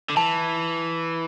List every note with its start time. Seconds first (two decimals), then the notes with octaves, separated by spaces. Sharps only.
0.10 D3
0.17 E3 A5